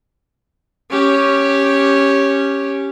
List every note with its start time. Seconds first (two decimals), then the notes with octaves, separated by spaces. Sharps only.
0.91 C#4 G4